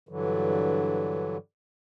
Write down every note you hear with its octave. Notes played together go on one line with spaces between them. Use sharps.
G2 D3 E3 F#3